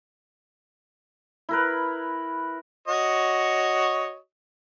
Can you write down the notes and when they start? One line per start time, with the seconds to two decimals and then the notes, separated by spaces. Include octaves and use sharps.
1.49 E4 A#4 B4
2.88 F#4 C#5 D#5